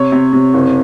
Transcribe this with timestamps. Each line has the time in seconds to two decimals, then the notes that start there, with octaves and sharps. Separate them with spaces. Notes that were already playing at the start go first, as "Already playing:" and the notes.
Already playing: C3 C#5
0.12 C3
0.33 C3
0.54 F#1